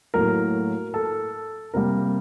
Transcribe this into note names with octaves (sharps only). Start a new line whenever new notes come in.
A2 F#3 A#3 A#4
A4
C3 G3 A#3 A#4